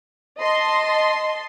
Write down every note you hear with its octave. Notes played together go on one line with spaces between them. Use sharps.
D#5 A5 C6